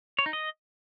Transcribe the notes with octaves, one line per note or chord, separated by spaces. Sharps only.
C#5
D#4
D#5